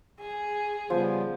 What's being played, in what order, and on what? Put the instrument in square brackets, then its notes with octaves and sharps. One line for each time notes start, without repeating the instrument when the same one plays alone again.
[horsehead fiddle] G#4
[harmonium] C#3 G3 B3 [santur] F3